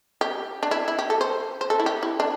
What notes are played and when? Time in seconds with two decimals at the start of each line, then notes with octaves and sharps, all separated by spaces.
0.21 G4
0.63 D4
0.71 E4
0.88 E4
0.99 G4
1.10 A4
1.21 C5
1.61 C5
1.70 A4
1.80 E4
1.86 G4
2.03 E4
2.20 D4